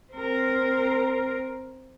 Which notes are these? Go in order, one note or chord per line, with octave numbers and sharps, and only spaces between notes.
C4 A#4